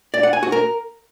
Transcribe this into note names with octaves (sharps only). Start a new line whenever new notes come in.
D5
F#5
G#5
F#4
A#4